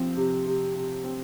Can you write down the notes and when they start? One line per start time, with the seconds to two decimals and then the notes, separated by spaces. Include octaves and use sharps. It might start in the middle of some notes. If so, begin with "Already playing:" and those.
Already playing: F3 C4
0.17 C3
0.46 C3
0.75 C3
1.04 C4